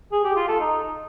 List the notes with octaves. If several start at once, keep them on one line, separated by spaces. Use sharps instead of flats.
G#4
G4
F4
A4
D#4